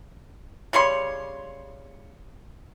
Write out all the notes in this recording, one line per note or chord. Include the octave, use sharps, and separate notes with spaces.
C#3 G3 C#5 C6